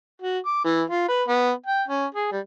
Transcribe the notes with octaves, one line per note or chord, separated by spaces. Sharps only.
F#4
D6
E3
F4
B4
B3
G5
C#4
G#4
G3